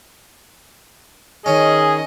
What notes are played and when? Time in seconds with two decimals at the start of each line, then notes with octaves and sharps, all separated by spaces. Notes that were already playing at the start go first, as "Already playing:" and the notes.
1.46 D#3 C#4 G#4 D#5